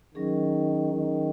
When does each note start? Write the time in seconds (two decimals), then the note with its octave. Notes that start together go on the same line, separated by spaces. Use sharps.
0.14 D#3 F#3 C#4 G#4
0.94 D#3